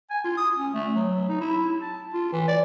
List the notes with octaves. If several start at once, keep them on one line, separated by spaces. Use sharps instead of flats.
G#5
F4
D#6
C#4
A3
F#3
D#4
E4
A5
F4
E3
D5